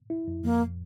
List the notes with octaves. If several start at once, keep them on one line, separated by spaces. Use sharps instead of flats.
E4
F2
F2 A#3